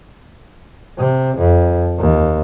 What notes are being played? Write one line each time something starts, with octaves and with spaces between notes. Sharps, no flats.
C3
F2
D#2